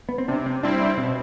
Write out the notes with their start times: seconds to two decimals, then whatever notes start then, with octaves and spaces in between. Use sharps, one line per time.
0.09 B3
0.18 C4
0.28 C3 D4
0.46 C4
0.63 G3 C4 D4 E4
0.80 D4
0.98 B2 C4